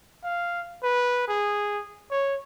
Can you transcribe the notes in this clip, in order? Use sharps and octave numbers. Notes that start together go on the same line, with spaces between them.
F5
B4
G#4
C#5